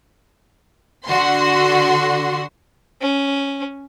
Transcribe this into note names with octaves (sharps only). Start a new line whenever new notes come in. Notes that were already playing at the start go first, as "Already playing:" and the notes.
D3 F#4 C6
C#4